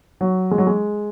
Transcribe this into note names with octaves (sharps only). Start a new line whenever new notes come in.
F#3
G#3
F#3
G#3